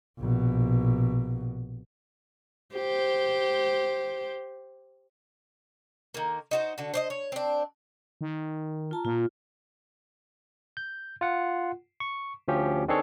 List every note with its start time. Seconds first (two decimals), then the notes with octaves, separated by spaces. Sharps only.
0.20 A#1 B2
2.75 G4 C5
6.14 D#3 A#3
6.51 D#4 F#4 C5
6.78 D3 F#4
6.94 C5 D5 D#5
7.10 C#5
7.32 C4 D4
8.21 D#3
8.91 F4 A5 A#5
9.05 A#2 F4
10.77 G6
11.21 F4 F#5
12.00 C#6
12.48 D2 F3 C#4 G4
12.88 D#3 C4 D4 G#4 A4 C#5